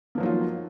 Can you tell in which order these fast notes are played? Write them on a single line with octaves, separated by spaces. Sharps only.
A#3 F3 F#3 D#4 F4